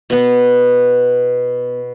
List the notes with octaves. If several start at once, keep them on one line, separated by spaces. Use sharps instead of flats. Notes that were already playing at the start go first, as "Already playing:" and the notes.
B2 B3